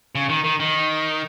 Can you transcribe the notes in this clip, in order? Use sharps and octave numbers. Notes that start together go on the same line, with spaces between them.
C#3
D#3
D#3
D#3